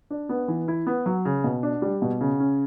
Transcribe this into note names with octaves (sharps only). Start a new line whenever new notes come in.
D4
B3
E3
E4
B3
F#3
C#3
B2
D4
G3
B2
C#3
C#4